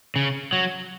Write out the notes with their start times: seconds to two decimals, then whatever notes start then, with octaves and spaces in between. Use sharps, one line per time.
0.16 C#3
0.53 F#3